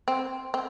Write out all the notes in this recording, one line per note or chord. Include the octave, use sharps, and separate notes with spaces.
C4
C4